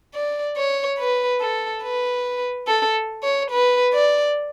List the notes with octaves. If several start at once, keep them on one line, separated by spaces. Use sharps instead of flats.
D5
C#5
B4
A4
B4
A4
C#5
B4
D5